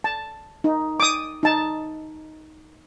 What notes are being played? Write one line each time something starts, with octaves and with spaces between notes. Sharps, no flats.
A5
D#4
D6 D#6
D#4 A5